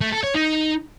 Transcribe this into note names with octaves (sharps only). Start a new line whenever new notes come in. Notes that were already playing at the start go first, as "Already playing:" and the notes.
A3
A4
C#5
D#4